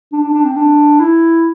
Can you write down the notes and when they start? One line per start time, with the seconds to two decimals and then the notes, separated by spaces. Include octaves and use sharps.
0.12 D4
0.23 D4
0.33 D4
0.44 C4
0.56 D4
1.00 E4